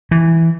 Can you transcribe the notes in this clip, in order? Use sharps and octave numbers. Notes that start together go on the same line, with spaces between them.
E3